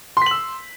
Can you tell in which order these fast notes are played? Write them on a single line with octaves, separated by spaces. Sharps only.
C6 B6 F#7 E6